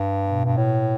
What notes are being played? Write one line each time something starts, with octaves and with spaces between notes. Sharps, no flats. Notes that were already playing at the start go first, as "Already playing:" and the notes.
Already playing: G2
B2
G2
A2